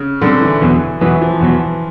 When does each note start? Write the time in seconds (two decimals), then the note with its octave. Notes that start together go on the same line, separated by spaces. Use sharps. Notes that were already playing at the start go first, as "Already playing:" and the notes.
Already playing: C#3
0.21 A#2 D3 G3 C4
0.41 E3
0.62 E2 B2 F#3 B3
1.01 E2 B2 E3 F#3 B3
1.22 F3
1.41 E2 B2 F#3 B3